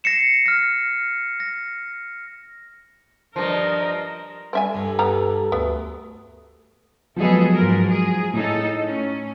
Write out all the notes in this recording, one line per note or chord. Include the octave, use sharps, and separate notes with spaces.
A#6 C7 C#7 E7
F6 A#6
A#6
G2 F3 A#4 D#5
G3 C4 E5 G#5
G2 A4
G3 B3 A#5
D2 B3
F3 F#3 G#3 B3 G#4 A4
G#2 A#4
G#4
A2 D#4 A4
C#4